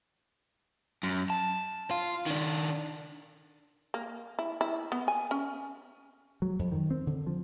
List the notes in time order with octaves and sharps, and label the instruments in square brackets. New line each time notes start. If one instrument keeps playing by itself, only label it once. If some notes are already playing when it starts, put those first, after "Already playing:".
[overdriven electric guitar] F#2
A5
F4
D#3 D4
[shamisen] A#3
E4
E4
B3
G#5
C#4
[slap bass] F#3
F2
D#3
C4
D3
F3